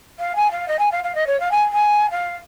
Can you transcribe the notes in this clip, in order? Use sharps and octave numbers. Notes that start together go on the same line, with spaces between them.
F5
G#5
F5
D#5
G#5
F5
F5
D#5
C#5
F5
G#5
G#5
F5